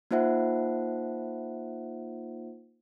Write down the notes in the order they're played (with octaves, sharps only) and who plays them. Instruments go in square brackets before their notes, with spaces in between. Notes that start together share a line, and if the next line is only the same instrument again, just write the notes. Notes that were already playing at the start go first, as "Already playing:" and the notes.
[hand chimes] A#3 D#4 F4 C5 E5 F#5